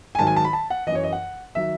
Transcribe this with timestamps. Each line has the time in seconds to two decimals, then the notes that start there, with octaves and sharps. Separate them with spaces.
0.15 G#5
0.19 G#2 D#3 F#3 A5
0.27 G#5
0.36 A5
0.44 B5
0.53 A5
0.70 F#5
0.87 E3 D#5
0.91 F#2 C#5
1.04 D#5
1.12 F#5
1.55 D#3 F#3 E5